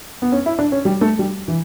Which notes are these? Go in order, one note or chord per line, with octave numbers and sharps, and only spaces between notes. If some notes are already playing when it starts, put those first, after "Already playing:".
B3
C#4
E4
D4
C#4
G3
A3
G3
E3